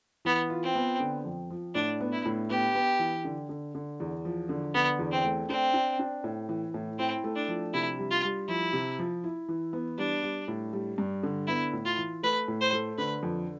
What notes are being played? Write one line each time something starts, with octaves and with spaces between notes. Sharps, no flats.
E3 B3
F4
C4
B3
D3
F2
F3
A2 D4
B3
E4
A2
B3 G4
B3
E3
D3
D3
D3
E2
F3
D3
D3 B3
E2
C4
A3
C4 D4
D4
D4
A2
E3
A2
C4 E4
A3
D4
F3
C3 E4
G3
F4
G3
F3 E4
C3
F3
E4
E3
B3
G3 D4
G3
A2
G3
G2
D3
B3 E4
A2
F4
E3
A3 B4
A2
C5
A3
D3 B4
F2